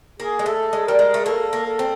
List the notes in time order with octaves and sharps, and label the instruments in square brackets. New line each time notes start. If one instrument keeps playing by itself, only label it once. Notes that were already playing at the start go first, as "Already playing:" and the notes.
[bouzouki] A#3 [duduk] G#4
[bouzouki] G#3
[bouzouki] A3 [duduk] A4
[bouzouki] G#3
[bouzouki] G3 [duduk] A#4
[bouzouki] G#3
A3
[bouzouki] A#3 [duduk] A4
[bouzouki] A#3
[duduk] A4
[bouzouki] C4